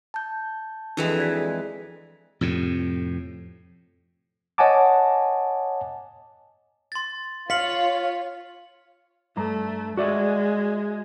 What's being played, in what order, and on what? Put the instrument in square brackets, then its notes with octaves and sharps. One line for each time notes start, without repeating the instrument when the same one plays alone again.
[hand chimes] A5 G6
[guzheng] F2 E3 G#3 [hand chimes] D4 E4 F#4
[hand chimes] D5 G#6 B6
[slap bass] F2 A2 C3
[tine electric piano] C#5 D#5 F#5 G#5 A5 D6
[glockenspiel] C6 A6
[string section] F4 C#5 [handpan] F5 [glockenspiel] B6 C#7 F#7
[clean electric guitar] G2 A#5 [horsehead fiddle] A3
[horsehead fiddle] G#3 [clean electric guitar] F#4 D5 E5